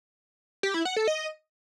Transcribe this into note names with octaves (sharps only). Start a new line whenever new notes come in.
G4
E4
F#5
A4
D#5